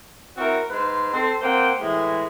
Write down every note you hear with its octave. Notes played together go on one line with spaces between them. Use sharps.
C4 E4 F#4 A#4 C#5
G#2 D#4 B4 C5
C4 A4 C6
A#3 C4 C5 F#5 G5
A2 E3 G#3